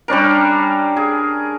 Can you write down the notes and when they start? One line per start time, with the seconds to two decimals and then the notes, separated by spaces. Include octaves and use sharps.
0.08 G3 C#4 D4 A#4
0.96 G#4